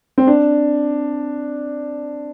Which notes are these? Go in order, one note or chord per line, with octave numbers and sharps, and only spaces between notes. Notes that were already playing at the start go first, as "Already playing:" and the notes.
C4
D4